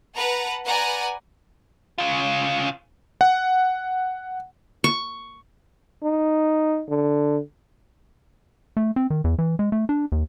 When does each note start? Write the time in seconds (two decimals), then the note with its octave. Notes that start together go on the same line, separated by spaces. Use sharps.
0.15 B4 F#5 A5 A#5
0.66 B4 D5 F#5 G#5 A#5
1.98 C#3 F4
3.21 F#5
4.84 C#6
6.03 D#4
6.89 D3
8.77 A3
8.96 C4
9.10 D#3
9.24 E2
9.39 E3
9.59 G#3
9.72 A3
9.89 D4
10.12 D#2